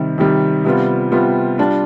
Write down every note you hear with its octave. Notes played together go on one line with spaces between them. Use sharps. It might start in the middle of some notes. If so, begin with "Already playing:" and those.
Already playing: C3 D#3 G3
C3 D#3 G3
C3 G3 B3 F4
C3 G3 B3 F4
G3 D4 F4